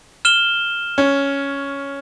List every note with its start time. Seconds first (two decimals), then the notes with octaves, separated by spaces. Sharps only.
0.25 F6 E7 G7
0.98 C#4